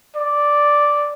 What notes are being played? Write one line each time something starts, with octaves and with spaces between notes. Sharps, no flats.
D5